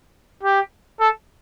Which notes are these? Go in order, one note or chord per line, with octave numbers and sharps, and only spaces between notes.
G4
A4